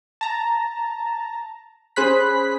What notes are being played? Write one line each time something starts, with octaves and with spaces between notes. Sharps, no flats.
A5 A#5
C#4 G#4 C5 B5 F#6 B6